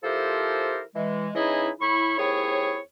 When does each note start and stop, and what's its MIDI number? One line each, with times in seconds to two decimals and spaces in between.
0.04 0.81 53
0.04 0.81 64
0.04 0.81 67
0.04 0.81 69
0.04 0.81 70
0.04 0.81 72
0.95 1.29 52
0.95 1.29 56
1.35 1.69 52
1.35 1.69 61
1.35 1.69 63
1.35 1.69 64
1.35 1.69 68
1.35 1.69 75
1.80 2.16 45
1.80 2.16 64
1.80 2.16 85
2.18 2.78 39
2.18 2.78 60
2.18 2.78 64
2.18 2.78 68
2.18 2.78 73